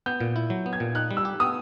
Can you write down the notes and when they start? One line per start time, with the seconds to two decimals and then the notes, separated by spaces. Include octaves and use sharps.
0.06 B3 G6
0.21 A#2
0.36 E4
0.50 F#3
0.66 B3
0.73 G#6
0.80 A#2
0.95 D#4 F#6
1.11 G3
1.17 E6
1.25 G4
1.40 B3 D#6